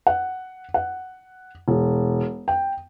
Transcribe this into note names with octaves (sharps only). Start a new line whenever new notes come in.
F#5
F#5
E1
G5